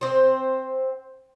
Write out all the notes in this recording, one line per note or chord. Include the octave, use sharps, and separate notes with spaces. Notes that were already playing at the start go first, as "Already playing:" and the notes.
C4 C5